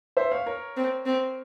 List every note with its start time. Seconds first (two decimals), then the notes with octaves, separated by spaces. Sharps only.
0.17 C5 E5
0.32 C#5 F5
0.46 A#4 C#5
0.77 C4
1.06 C4